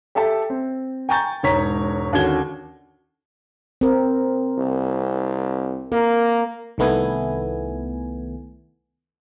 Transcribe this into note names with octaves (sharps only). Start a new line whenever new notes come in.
G4 A4 E5 A5
C4
G5 G#5 A#5 C#6 G6 A6
E1 G#2 C#5 A#5 B6
D#2 D3 C#4 F#4 G#6 G7
C4 A#4
C2
A#3 A#4
C2 D#3 A3 B3 E4 G#5